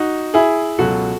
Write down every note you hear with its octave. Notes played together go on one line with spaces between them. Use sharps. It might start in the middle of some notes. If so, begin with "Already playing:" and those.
Already playing: D#4 F#4
E4 G#4
C#2 B2 F#3 F#4 A4